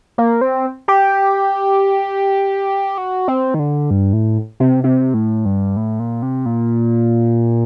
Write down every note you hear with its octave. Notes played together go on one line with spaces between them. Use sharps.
A#3
C4
G4
F#4
C4
D#3
D3
G2
A2
C3
C3
A2
G2
A2
A#2
C3
A#2